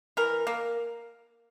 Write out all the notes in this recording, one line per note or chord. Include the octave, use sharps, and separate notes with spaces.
E3 A#4
A#3